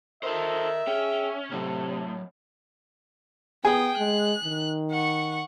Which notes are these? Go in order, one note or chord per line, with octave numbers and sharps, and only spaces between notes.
A4 A#4 C5 D#5 E5
C#4 G#4 G5
A2 C3 F#3 C4
B3 G#4 G5 D#6
G#3 F#6
D#3
F#5 C#6